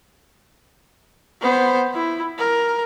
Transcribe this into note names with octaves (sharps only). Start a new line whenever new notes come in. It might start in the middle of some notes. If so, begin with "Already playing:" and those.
B3 C5
E4
A#4